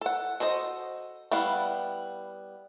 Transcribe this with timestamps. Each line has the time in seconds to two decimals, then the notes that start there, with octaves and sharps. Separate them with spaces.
0.01 A4 F#5
0.40 F#4 A4 C5 D#5
1.31 G3 B3 E4 F5 F#5